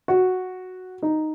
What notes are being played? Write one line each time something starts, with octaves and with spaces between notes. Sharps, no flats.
F#4
D#4